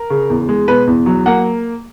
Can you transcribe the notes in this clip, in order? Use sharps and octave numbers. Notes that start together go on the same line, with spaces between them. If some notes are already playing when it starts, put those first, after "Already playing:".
Already playing: A#4
C#3
E2
G#3
B2 B4
E2
F#3
A#3 F#5